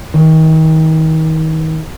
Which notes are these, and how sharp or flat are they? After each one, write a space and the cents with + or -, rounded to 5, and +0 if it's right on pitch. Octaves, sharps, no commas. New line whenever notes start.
D#3 +35